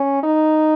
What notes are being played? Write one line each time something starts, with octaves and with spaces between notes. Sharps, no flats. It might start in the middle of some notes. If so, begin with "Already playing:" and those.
Already playing: C#4
D#4